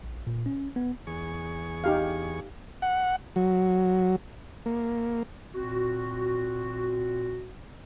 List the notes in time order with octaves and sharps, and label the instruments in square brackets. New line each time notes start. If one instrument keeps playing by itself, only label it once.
[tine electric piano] A#1
A#2
C#4
B3
[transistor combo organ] E2 G#4 C#6
[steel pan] D#4 G4 F5
[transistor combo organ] F#5
F#3
A#3
[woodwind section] A#2 C4 F#4